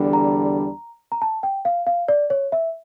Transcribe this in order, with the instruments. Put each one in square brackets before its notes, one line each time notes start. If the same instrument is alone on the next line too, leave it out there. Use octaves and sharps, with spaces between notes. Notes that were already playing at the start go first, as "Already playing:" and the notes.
Already playing: [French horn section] E2 D3 G3 D4
[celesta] A#5
A#5
A5
G5
F5
F5
D5
C#5
E5